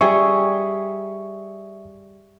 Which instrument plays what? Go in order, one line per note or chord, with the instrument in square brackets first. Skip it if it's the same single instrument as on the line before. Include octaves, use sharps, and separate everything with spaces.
[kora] G3 G#4 C#5 [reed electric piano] E5 C#6